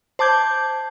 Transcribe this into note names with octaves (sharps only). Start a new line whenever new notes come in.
C5 A5 D6 G6 G#6